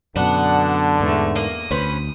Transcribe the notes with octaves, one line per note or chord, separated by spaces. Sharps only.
F#2 B2 D3 B3 D4 F#5
E2 G#2 A3
A#3 D#6
D2 C#4 B4 C5